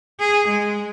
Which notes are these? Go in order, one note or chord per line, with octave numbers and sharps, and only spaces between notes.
G#4
G#3